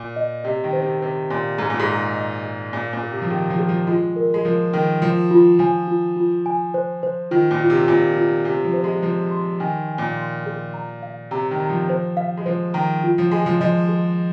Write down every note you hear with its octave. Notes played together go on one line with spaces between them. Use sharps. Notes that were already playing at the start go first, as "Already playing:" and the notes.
Already playing: A#2
D#5
C3 D#5
D#3
C5
C3
C3 C5
A#2 C6
G#2 A#5
A#2
G#2
A#5
D#5
G#4
A#2 G#4
A#2
G#4
C3
F3
D#3 G#4
F3
G#4
F3
G#3 F4
A#4
G#3
F3 A#4
D#3 A#4
F3 F4
F4
F3 G#5
F4
F4
G#5
C5
C5
D#3 F4
A#2
F4
C3
A#2 F4
F4
C3 G#5
F3
C5
G#3
F3 C5
C6
D#3 G#5
G#5
A#2
C6
G#4
A#5
F5
C3 A#5
D#3
A#5
F3
C5
F5
G#3
F3 C5
D#3 A#5
F4
F3
G#3 G#5
F3
F3 D#5
G#4